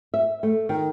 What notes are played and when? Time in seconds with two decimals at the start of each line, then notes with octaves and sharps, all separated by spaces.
0.14 E5
0.43 A3
0.69 D#3